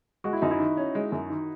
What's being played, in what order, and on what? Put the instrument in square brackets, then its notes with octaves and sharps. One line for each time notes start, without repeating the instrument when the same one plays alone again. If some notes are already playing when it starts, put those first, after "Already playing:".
[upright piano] G#3 [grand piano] F#4
[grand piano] E4
[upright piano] F#2 [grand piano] D#4
[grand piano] E4
[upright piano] D#3
C#4
G#3
F#2
D#3